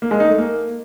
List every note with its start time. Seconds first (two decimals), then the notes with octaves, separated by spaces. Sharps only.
0.02 A#3
0.11 G#3
0.20 D#4
0.29 A3
0.38 A#3